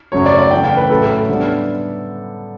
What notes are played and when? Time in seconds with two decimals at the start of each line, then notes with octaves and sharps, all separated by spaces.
0.12 F#2 C#3 F#3 A3 C#5
0.26 D5
0.39 D5
0.51 C#3 E3 A3 G5
0.65 G5
0.77 B4
0.90 A2 F#3 A3 C#4 A4
1.29 D3 G3 B3 D4